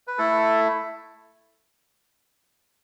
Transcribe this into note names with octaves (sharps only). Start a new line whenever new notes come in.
B4
A3 E4 A4